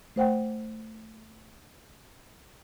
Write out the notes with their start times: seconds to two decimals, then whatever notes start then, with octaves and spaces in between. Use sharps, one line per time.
0.16 A3 C5 F#5 G5